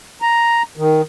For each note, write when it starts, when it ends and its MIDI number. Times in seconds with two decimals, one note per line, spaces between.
0.22 0.63 82
0.77 1.01 51